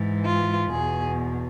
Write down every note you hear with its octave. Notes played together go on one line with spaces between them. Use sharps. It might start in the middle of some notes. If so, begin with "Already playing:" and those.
Already playing: G#2 E3
F4
E2 B2 G#4